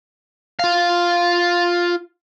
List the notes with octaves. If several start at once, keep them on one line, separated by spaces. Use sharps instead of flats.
F4 F5